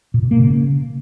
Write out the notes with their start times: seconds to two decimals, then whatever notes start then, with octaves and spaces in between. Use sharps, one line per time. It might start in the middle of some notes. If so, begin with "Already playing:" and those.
0.14 A#2
0.23 B2
0.31 A#3
0.40 C#3